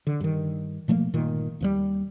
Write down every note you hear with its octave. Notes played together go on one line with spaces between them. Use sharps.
D3
G2 D#3
B2 F3 A3 A#3
G1 A#2 D#3
D#2 C3 G3